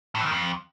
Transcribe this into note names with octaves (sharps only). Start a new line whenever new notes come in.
A2
E3
D#3
F2